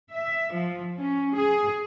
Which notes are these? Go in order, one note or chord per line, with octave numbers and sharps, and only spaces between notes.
E5
F3
C#4
G#4